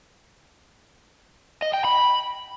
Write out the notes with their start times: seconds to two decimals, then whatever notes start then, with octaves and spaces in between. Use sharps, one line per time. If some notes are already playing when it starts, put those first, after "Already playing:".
1.62 D#5
1.74 G5
1.85 B5